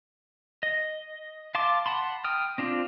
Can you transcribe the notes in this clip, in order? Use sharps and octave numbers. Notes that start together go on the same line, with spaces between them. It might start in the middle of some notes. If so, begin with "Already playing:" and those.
D#5
F5 A5 C6 D6
F#5 A5 B5 C6
G5 D#6 F6
C4 D4 F4